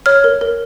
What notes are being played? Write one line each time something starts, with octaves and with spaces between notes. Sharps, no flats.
C#5 F6
A#4
A#4